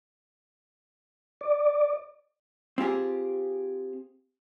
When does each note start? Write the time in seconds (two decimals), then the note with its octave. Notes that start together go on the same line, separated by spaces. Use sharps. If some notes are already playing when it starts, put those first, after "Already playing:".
1.41 D5
2.78 C4 F4 G4 G#4